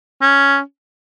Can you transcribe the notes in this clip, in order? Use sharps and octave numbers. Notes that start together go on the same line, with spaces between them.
C#4